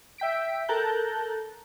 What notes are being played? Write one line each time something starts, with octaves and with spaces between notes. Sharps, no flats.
E5 G5 B6 D7
A4 A#4 A5 A#5 F#6 G6